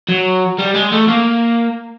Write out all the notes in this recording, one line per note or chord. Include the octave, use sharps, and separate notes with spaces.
F#3
G3
G#3
A3
A#3